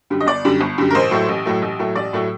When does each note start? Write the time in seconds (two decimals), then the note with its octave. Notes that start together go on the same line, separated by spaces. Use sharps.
0.10 F#2 D3 G3
0.20 D#5
0.27 G1 D5
0.45 F#2 D3 G3
0.61 G1
0.78 F#2 D3 G3
0.90 A#4
0.94 A1 C5
1.11 A2 F#3 A3
1.28 A1
1.45 A2 F#3 A3
1.62 A1
1.79 A2 F#3 A3
1.95 A1 D5
2.13 A2 F#3 A3